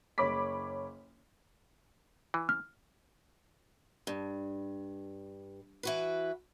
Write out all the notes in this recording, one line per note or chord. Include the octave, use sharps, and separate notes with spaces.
F#1 C#5 B5 D6 B6
E3
F6
G2
E3 F#4 B4